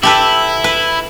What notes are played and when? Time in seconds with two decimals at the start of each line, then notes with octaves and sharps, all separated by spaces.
0.03 E4 G4 A4 B4
0.64 B4